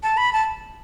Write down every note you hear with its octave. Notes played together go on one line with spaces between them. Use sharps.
A5
B5
A5